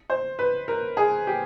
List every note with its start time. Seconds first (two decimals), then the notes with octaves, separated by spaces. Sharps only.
0.10 C5
0.39 B4
0.68 A#4
0.97 G#4
1.27 G4